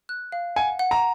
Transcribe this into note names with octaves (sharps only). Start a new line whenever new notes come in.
F#6
F5
F#5 G#5
F#5
A#5